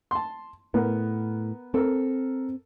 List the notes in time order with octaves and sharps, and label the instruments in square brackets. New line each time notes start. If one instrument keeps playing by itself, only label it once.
[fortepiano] A5 C6
[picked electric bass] A2 [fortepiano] B3 A#4
[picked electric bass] C4 [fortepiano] A4 A#4